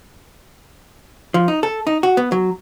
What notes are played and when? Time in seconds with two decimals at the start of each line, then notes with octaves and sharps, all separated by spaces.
1.34 F3
1.48 D#4
1.63 A4
1.87 D#4
2.03 F#4
2.17 B3
2.32 F#3